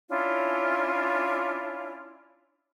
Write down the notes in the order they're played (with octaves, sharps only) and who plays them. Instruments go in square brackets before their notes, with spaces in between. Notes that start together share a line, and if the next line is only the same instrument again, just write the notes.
[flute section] C#4 D4 E4 F4